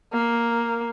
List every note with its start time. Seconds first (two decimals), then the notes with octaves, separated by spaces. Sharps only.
0.13 A#3